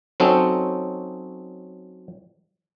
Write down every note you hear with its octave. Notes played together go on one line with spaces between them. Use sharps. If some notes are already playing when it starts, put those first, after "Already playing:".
F#3 C4 C#4 D#4 A4